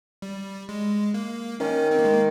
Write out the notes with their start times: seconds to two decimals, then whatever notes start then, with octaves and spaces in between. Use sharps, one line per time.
0.22 G3
0.69 G#3
1.14 A#3
1.60 D#3 C#4
1.91 C4
1.99 A#3
2.05 G#3
2.13 A#3